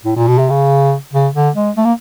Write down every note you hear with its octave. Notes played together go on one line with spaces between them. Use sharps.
A2
A#2
B2
C3
C#3
C#3
D3
G#3
A3
A#3